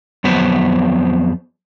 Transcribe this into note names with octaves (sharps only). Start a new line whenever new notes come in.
F2 F#3 B3 B4 C5